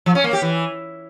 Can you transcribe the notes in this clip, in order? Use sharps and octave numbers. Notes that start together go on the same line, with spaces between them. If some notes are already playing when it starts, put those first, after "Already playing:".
F3
C#4
A#3
G4
E3